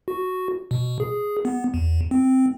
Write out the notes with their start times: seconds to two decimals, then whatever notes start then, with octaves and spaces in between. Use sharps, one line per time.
0.08 F#4
0.71 B2
1.00 G#4
1.45 B3
1.74 E2
2.11 C4